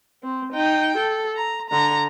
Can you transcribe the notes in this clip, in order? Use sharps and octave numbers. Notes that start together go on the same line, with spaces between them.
C4
D#4 G5
A4
A#5
D3 A#5